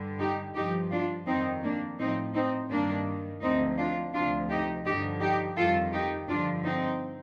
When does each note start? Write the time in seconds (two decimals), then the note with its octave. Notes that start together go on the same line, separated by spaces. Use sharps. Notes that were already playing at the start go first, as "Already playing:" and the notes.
Already playing: G2 D3 G3
0.20 D#4 G4
0.55 G2 F3 D#4 G4
0.91 D4 F4
1.27 F2 D#3 G3 C4 D#4
1.63 A#3 D4
1.98 A2 F3 C4 D#4
2.34 C4 D#4
2.70 G2 D#3 G3 A#3 D4
3.42 D2 D3 F3 C4 D#4
3.78 D4 F4
4.13 D2 C3 F3 D4 F4
4.49 D#4 G4
4.85 G2 D3 F3 D#4 G4
5.21 D#4 G4
5.56 F2 D#3 G3 F4 A4
5.93 D#4 G4
6.28 G2 D3 F3 D4 F4
6.64 C4 D#4